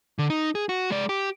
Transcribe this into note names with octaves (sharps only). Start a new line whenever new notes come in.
D3
D#4
G#4
F#4
G#3 D5
G4